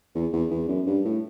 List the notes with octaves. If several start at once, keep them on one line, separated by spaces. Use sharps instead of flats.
E2
E2
E2
F#2
G2
A2